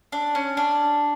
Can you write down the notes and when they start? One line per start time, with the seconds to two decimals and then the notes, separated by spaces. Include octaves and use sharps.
0.12 D4
0.35 C#4
0.57 D4